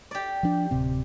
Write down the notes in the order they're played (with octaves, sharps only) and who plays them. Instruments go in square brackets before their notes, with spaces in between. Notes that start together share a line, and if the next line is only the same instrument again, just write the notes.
[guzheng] G4 D5
[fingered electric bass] F3 D4
D1 C3 C4